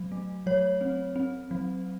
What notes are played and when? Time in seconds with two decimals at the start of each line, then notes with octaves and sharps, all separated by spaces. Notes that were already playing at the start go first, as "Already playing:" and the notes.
Already playing: F#3
0.11 A3
0.46 F#3 C#5
0.81 C4
1.16 C4
1.51 F#3